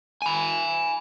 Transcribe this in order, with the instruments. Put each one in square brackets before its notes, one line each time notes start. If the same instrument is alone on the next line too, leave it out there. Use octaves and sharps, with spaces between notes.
[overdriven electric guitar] G#5 B5